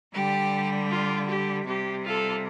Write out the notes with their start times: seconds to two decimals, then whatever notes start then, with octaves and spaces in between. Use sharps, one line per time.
0.13 D3 G3 G4
0.90 F4
1.28 G4
1.66 C3 G3 G4
2.04 F4 A4